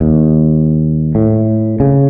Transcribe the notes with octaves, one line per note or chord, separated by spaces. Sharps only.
D#2
A2
C#3